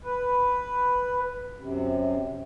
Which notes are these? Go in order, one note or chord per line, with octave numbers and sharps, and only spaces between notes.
B4
F#2 C3